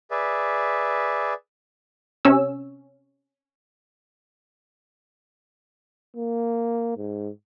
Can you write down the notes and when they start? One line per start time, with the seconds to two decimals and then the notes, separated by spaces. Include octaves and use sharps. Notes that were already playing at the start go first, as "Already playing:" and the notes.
0.11 G#4 B4 D5 E5
2.25 C3 C#4 E6
6.16 A#3
6.97 G#2